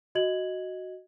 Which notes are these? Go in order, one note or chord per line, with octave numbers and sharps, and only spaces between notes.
F#4 D#5 G#6 F#7